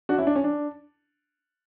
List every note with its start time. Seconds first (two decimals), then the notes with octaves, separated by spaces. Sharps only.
0.09 D4 F#4
0.18 C#4 E4
0.27 D4
0.36 C#4
0.44 D4